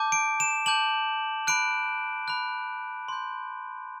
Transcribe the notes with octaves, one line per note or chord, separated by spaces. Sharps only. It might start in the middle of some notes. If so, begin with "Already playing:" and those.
Already playing: A5 D6 G6
D7
E7
A5 D6 G6 F#7
B5 F#6 D7
B5 F#6
C6 G6